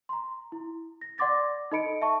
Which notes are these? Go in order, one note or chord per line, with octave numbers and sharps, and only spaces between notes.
A#5 C6
E4
A#6
D5 F#5 C6 D6 A6 A#6
D#4 A4 D#5 B5 C#7 D7
E5 A5 C#6